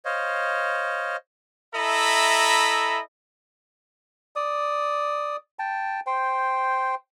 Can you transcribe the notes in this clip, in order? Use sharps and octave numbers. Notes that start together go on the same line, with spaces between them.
C5 C#5 D#5 F5
E4 A4 D#5 E5 A#5 B5
D5 D#6
G5 A5
C5 G5